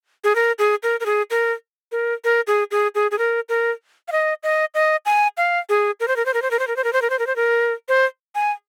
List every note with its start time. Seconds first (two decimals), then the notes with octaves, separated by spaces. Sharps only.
0.24 G#4
0.35 A#4
0.59 G#4
0.83 A#4
1.00 A#4
1.06 G#4
1.30 A#4
1.92 A#4
2.24 A#4
2.47 G#4
2.71 G#4
2.95 G#4
3.11 G#4
3.18 A#4
3.49 A#4
4.08 F5
4.12 D#5
4.43 D#5
4.74 D#5
5.06 G#5
5.37 F5
5.69 G#4
6.00 A#4
6.08 C5
6.16 A#4
6.26 C5
6.34 A#4
6.42 C5
6.51 A#4
6.59 C5
6.67 A#4
6.76 C5
6.84 A#4
6.93 C5
7.02 A#4
7.10 C5
7.19 A#4
7.27 C5
7.36 A#4
7.89 C5
8.35 G#5